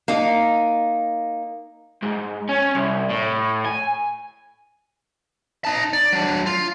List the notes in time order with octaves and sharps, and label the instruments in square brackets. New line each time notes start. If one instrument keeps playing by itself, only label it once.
[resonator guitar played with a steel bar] A#3 D#4
[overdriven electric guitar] G#2
C#4
C2
A2
G#5
[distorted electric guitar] D#4 A5
D5
F#3 D4
F4